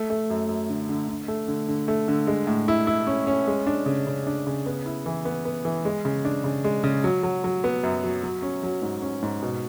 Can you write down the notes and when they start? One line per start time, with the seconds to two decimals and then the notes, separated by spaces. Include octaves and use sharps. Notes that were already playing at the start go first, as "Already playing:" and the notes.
Already playing: A3
0.10 A3
0.30 F#2
0.49 F#2
0.69 D3
0.89 D3
1.08 D3
1.28 A3
1.48 D3
1.68 D3
1.88 A3
2.08 D3
2.27 G#3
2.47 A2
2.68 E4
2.87 E4
3.07 C#4
3.27 C#4
3.47 G#3
3.67 D4
3.86 C#3
4.07 C#3
4.27 D4
4.47 C#3
4.66 B3
4.86 E4
5.06 E3
5.25 B3
5.45 B3
5.65 E3
5.85 G#3
6.05 C#3
6.25 D4
6.44 C#3
6.64 G#3
6.84 C#3
7.04 F#3
7.23 F#3
7.44 F#3
7.64 B3
7.83 F#2
8.04 F#3
8.23 F#3
8.42 C#4
8.63 F#3
8.82 G#2
9.02 C#4
9.22 G#2
9.42 B2